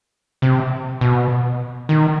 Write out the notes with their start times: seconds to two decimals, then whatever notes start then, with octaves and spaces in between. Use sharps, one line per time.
0.42 C3
1.01 B2
1.89 D#3